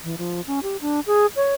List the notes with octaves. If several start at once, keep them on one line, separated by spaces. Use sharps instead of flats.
E3
F3
C#4
G4
D4
G#4
C#5